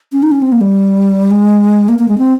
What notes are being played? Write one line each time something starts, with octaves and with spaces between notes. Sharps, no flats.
C#4
D#4
C#4
C4
A#3
G3
G#3
A#3
A#3
G#3
C4